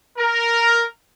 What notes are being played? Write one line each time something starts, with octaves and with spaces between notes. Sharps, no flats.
A#4